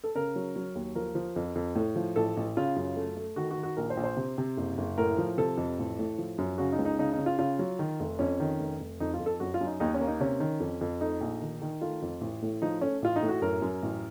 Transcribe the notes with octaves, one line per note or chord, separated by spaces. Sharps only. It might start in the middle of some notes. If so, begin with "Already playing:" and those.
A4
C#3 A#4
F#3
F#3
D#2
F3 A#4
F3
F2
F2
A2
F3
A1 A4
A1
C#3 F4
F#2
A3
A3
D#3 F#4
F#4
D#3
F#4
A#1 A#4
C5
A#1
C5
C3
C3
F#1
F#1
A2 A#4
F3
C3 A4
F2
A1
A2
F3
F#2
C#3 F#4
D#4
C#2
D#4
C#3 D#4
D#4
C#3
F4
C#3 F4
F#3
D#3
F1
F2 C#4
D#3
F1
F1
F2 D#4
F4
F2
A4
F#2 F#4
F4
F#2
D#4
D#2 D#4
C#4
A#3
D#4
C3 C#4
D#3
F2
F2
A3 D#4
A#1
D#3
D#3
A3 F4
F2
A1
A2
F3 D#4
A3 C#4
A1 F4
D#4
A2
F#4
F#2 A#4
F#2
A1